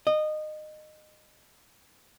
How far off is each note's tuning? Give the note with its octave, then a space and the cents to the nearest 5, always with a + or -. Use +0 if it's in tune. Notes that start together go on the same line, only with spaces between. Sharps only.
D#5 -20